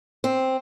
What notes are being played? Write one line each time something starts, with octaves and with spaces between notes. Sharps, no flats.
C4